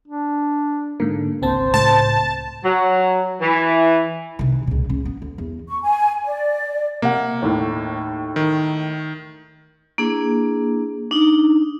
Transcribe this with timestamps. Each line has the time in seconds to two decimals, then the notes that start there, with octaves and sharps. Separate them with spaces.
0.08 D4
1.00 G#2 D3 A#3
1.42 G#1 C#2 C4 C5 A5
1.74 C#2 A2 A5
2.64 F#3
3.41 E3
4.39 C3 D#3
4.67 C#2 A#2
4.90 C#4
5.05 B3
5.22 D2
5.38 E2
5.68 C#6
5.83 G#5
6.25 D5
7.02 C3 A#3 F#5
7.42 D#2 A2
8.36 D#3
9.98 A#3 D4 E4 G#4
11.11 D4 D#4